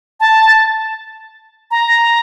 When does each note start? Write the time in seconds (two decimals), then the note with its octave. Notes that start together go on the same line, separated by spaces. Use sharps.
0.20 A5
1.71 A#5